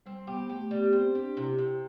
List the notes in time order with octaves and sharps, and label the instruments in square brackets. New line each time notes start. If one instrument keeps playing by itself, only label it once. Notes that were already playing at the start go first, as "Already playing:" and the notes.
[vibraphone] G3 [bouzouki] C4
[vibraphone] B3 [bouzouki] G4
[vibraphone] A3 [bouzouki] G4
[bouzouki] G3 [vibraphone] B3
[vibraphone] B3
[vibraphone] C4 [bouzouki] C5
[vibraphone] C4
[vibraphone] D4 [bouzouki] G4
[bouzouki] C3 [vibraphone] E4
[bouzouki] C3 [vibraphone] G4